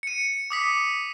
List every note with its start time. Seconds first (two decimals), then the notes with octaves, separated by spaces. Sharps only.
0.03 C#7 D#7
0.50 D6 D#6 B6